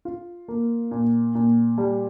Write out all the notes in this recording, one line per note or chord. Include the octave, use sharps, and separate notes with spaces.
F4
A#3
A#2
A#2
G3